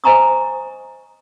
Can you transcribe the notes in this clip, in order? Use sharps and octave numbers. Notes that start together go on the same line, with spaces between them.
C5 D#5 G#5 A#5 C#6 D#6